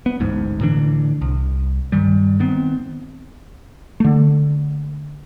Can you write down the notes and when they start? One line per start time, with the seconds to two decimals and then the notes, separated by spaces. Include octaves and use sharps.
0.06 B3
0.20 D1 A1 G#2
0.60 A2 D3 E3 D4
1.21 C2
1.92 G2 D#3 G3
2.40 D#3 B3 C4
4.00 D3 A3